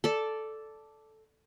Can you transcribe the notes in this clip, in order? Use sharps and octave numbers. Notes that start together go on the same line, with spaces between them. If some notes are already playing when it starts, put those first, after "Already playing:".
A4 D5